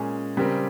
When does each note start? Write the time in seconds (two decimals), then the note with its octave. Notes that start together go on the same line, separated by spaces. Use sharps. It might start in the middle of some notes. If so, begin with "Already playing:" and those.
Already playing: A#2 G#3 C#4 G#4
0.37 C#3 G3 C4 G4 A#4